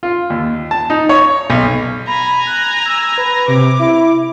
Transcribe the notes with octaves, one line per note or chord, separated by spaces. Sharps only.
F4
D#2
A5
D#4
C#5
B1
G#5 A#5 B5
F#6
E6
B4
C3 D6
E4